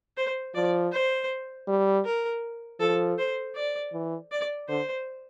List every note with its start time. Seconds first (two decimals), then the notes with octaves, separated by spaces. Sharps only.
0.17 C5
0.55 F3 D5
0.92 C5
1.68 G3
2.05 A#4
2.80 F3 A4
3.18 C5
3.55 D5
3.93 E3
4.31 D5
4.68 D3 C5